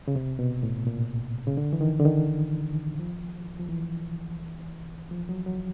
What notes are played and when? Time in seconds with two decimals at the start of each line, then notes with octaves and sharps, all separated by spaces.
0.08 C#3
0.16 C3
0.39 B2
0.63 A2
0.87 A#2
1.47 C#3
1.57 D3
1.73 E3
1.81 D#3
1.99 D3
2.05 D#3
2.99 F3
3.60 F3
3.69 E3
5.11 F3
5.29 F#3
5.46 F#3